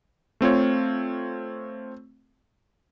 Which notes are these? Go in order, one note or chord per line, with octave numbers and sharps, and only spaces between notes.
A3 C4 F4 C#5